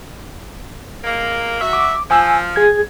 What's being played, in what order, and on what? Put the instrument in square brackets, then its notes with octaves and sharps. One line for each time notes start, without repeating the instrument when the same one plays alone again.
[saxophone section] A#2 G#3 A#3
F#3 F#4 E5
[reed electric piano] D6
[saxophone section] F3 [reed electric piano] G#5 E6
[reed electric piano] G#4 G#6